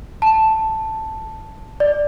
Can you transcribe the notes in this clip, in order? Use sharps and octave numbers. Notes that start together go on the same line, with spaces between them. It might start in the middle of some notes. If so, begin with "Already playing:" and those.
A5
D5